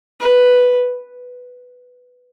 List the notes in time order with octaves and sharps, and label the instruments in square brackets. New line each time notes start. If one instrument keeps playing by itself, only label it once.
[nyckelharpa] B4